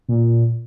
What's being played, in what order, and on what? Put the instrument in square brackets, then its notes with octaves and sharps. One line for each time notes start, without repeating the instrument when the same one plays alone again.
[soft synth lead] A#2